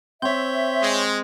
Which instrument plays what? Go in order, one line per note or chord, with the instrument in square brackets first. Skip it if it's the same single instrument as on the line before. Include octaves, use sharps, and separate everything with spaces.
[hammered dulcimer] C4 [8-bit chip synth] C#5 G6 [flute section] E5
[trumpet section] G#3